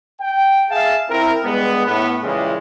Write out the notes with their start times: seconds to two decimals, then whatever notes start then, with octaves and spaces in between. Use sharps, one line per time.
0.21 G5
0.70 G#4 E5 F5 A5
1.09 C4 E4 A#4
1.44 G2 G#3 B3
1.86 A2 B3
2.22 A#2 C#3 E3 G3 G#3